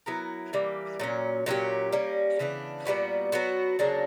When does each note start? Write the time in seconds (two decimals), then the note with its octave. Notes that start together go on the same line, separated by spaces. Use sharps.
0.06 F#3 B3 E4 A#4
0.53 E3 G3 A#3
1.00 A#2 F#3 C#4
1.46 A#2 F#3 C#4 G4
1.92 G3 A#3 C#4
2.39 C#3 E3 B3 D4
2.85 A#2 G3 B3 F#4
3.32 F#3 B3 F#4
3.79 C#3 F#3 A#3 D4